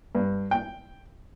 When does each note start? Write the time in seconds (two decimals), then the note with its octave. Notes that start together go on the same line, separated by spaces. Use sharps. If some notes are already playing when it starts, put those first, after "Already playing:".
0.15 G2
0.51 G5